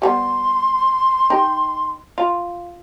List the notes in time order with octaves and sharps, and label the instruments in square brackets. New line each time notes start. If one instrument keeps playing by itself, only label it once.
[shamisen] G3 A3 B3 [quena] C6
[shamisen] D#4 G4
F4